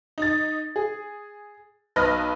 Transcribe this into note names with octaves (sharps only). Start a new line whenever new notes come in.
D#4 A6
G#4
B1 B4 D#5 F6 A#6